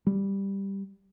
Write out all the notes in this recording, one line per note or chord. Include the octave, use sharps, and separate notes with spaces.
G3